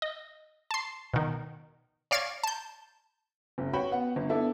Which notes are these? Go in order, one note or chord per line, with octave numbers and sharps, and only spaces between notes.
D#5
A5 C6
B2 D#3
C#5 D5 F5 F6 G#6 A6
A5 G6
F#1
F#4 B4 C#5 G5 B5
B3 F#5
G1
B3 D4 E4 A4